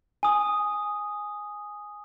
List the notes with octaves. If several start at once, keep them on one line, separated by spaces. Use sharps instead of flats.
G#5 D#6